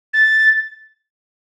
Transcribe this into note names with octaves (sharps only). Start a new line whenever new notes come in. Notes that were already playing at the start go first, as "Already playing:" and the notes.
A6